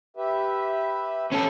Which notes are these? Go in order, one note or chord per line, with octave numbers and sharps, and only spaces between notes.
G4 B4 E5
C#4 A4